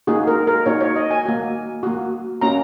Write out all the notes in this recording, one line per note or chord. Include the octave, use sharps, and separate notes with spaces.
A#3 D#4 F#4 G#4
A#4
A#4
A#3 D#4 F#4 C#5
C#5
D#5
G#5
A#3 F#4
A#3 F#4
A#3 C#4 F#4 A#5